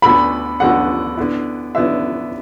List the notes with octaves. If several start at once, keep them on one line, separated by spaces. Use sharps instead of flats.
D2 D3 B3 F#4 A4 B5
D2 D3 B3 F#4 A4 F#5
D3 B3 E4
D3 B3 E4 E5